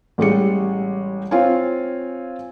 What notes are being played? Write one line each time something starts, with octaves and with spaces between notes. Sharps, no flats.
A1 G3 G#3 C#7
C4 F4 C#5 F5 G#5